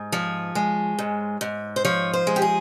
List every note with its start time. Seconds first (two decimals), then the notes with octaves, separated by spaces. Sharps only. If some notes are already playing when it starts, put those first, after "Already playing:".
Already playing: G#2
0.12 F3 C#5
0.55 G#3
0.99 G#2
1.41 G#2
1.76 C5
1.85 F3 C#5
2.13 C5
2.27 G#3
2.36 G4
2.42 G#4